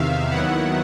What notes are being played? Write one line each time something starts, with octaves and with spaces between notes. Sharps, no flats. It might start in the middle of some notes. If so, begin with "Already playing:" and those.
Already playing: E2 C3 D#3 E5 F5
D#2 D#3 F#3 B3 E4 F#5